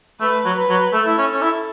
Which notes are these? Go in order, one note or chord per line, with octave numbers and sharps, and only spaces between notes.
A3 B4
F#3
B4
F#3
A3 A4
E4
C#4
C#4
E4